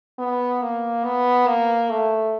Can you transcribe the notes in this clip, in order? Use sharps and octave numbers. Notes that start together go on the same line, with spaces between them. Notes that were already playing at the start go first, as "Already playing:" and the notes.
B3
A#3
B3
A#3
A3